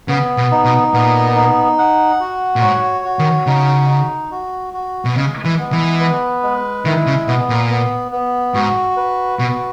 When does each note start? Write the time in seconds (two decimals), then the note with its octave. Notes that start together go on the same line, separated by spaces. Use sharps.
0.08 C#3 B3
0.37 B2
0.51 D#4
0.65 B2
0.93 A#2 B3
1.35 D#4
1.78 F#5
2.20 F#4
2.56 A#2
2.62 G#2 C#5
3.05 F#4
3.19 D#3
3.47 C#3 D#4
3.89 D#4
4.31 F#4
4.73 F#4
5.05 B2
5.16 C#3 G#3
5.45 E3
5.58 B3
5.72 E3
6.00 B4
6.43 G#3
6.85 D#3 E4
7.07 C#3
7.27 B2 B3
7.49 A#2
7.70 B3
8.12 B3
8.54 G#2 F#4
8.97 B4
9.39 B2 F#4